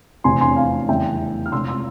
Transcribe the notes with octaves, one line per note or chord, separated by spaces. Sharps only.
F1 E2 C3 G#5 C6
G#5 C6
F5 G#5
F1 E2 C#3 G3 E5 G5
F6
C#2 C3 F3 C6 E6
C6 E6